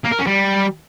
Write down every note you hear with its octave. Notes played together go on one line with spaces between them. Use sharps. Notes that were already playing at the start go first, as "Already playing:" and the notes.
A#3
A#4
C#4
G3